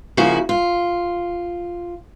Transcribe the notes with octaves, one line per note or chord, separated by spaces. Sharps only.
C#3 F3 A#3 E4 F#4
F4